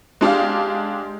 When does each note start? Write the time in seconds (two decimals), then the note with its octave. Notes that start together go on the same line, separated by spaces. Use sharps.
0.21 G#3 D4 G4 F5